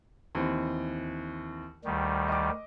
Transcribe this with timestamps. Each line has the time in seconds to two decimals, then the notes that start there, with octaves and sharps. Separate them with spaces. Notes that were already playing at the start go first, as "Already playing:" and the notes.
0.35 D#2 E3 C4
1.85 D2 D#3 G3
2.28 D#5 D6